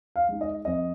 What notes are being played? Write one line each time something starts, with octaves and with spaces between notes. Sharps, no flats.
F5
G#3 D#4
D#5
F2 D#5